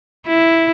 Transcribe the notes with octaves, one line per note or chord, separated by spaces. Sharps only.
E4